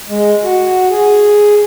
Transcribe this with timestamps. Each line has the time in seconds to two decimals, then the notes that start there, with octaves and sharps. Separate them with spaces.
0.08 G#3
0.43 F#4
0.90 G#4